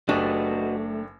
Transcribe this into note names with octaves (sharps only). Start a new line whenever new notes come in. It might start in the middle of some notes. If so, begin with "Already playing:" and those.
F#1 A3 D4 F#4 G4 B4 D#5 C#6